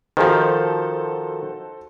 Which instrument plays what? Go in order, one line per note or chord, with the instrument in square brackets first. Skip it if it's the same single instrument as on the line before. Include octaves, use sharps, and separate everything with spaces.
[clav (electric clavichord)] D#3 F3 [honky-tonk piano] F#4 A4 C5